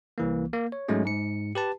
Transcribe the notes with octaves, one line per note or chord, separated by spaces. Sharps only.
C2 E3 A#3
A#3
C#5
G#2 F#3 G#3 A3 C#4
G#2 C#7
G4 B4 A5